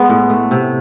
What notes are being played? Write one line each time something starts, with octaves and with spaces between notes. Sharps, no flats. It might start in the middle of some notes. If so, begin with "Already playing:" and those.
Already playing: G#3 B3
A2
A3
C3